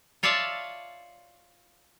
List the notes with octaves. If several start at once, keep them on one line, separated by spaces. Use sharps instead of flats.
F4 C#5 D5 E5 F5 A5